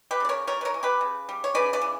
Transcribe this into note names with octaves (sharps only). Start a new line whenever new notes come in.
G4 B4
C#3 D5
A#4 C#5
G3 A#4 C#5
B4
A#4 C#5
E3
G4 B4
C#3
G3
C#5
C#3 B4 D5
B4 D5
E3